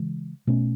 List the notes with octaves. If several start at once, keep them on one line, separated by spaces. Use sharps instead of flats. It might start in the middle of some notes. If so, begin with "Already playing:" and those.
Already playing: C#3 E3 G#3
B2 A3 C#4